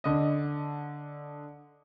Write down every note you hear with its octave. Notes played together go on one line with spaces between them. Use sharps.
D3 D#5